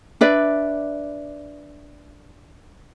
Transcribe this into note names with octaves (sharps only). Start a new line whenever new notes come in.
D4 B4 D5 E5